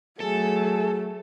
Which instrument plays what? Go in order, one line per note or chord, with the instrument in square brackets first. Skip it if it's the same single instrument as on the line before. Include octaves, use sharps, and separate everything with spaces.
[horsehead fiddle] F#3 A3 [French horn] G#4 [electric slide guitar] A4